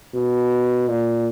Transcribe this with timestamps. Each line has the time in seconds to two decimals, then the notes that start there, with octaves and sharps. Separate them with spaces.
0.14 B2
0.88 A#2